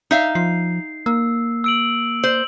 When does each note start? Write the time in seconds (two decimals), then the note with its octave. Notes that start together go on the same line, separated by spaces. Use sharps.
0.11 D#4 E5 F5
0.35 F3 C7
1.06 A#3 E6
1.64 E6 D7 F#7
2.24 C5 F#7